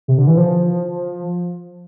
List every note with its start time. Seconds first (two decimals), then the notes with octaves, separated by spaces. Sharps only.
0.08 C3
0.18 D3
0.27 E3
0.37 F3